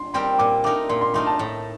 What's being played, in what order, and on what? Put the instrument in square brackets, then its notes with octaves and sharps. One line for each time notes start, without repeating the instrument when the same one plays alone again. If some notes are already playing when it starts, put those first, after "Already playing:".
Already playing: [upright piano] C6
[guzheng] G3 C4 G4 A#4 [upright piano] C6
[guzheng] A#2 [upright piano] D6
[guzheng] A3 D#4 A#4 [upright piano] D6
[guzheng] A#2 [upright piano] C6
[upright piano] C6
[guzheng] A3 D#4 A#4 [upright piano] C6
[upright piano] A5
[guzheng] A2